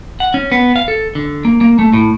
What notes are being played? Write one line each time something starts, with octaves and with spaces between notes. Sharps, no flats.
F#5
C#4
B3
F5
A4
D3
A#3
A#3
A3
A2